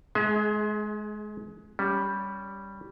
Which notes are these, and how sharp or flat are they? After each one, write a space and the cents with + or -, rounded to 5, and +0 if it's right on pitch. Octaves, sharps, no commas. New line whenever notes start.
G#3 +25 G#4 +0 E5 -45
G3 +0 C#4 +20